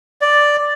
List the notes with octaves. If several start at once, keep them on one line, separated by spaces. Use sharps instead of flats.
D5